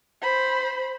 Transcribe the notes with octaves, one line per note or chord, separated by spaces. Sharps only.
C5 B5